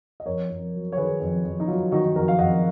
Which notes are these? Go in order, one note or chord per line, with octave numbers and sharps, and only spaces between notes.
D#5
F2 A#4 C#5
F2
F#3
C#5
D#3 G#4 B4
F2
F2
D#4
F#3 F4
D#3 D#4 F#4
F2 F#4 A#4
F5
F2 D#5 F#5